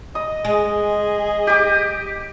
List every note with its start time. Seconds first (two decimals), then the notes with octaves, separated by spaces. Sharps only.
0.15 D#5 D#6
0.45 G#3 G#4
1.47 G4 D6